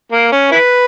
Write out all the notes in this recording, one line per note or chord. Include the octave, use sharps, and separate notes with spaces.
A#3
C#4
E4 B4